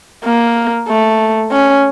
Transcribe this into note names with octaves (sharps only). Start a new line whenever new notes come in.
A#3
A3
C#4